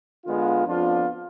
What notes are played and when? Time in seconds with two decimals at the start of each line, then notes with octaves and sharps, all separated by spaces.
0.25 D3 G#3 B3 F4
0.66 F2 F3 B3 D4 F4